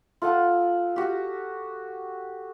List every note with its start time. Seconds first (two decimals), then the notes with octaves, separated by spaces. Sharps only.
0.22 F4 A4 F#5 A5
0.96 F#4 G4